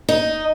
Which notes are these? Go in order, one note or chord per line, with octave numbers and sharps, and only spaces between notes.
D#4